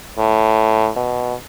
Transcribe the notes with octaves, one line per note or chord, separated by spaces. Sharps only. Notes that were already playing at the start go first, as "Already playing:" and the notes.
A2
B2